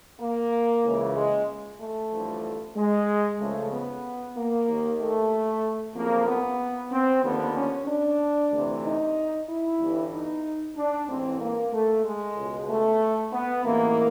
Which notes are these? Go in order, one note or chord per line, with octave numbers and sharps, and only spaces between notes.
A#3
C#2 C#3 E3
G#3
A3
A1 G2 D3 F3
G#3
C#2 C#3 F3 A3
B3
A#3
D#2 D#3
A3
F#1 F2 C#3 F3 A#3
B3
C4
D#2 D3 F3 B3
C#4
D4
D2 C3 E3
D#4
E4
G1 G2 E3
D#4
D4
A1 G#2 E3 C4
A#3
A3
G#3
C#2 B2
A3
B3
A1 G#2 E3 A#3